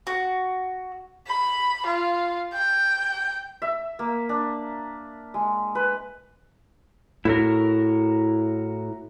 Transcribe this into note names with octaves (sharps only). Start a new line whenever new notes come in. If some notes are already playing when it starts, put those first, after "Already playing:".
F#4
B5
F4
G5
E5
A#3
D4
G#3
B4
A2 E4 F#4 A#4